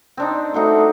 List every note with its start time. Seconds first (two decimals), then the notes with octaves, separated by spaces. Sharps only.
0.17 C4 D4 D#4
0.54 A3 D#4 F#4 C5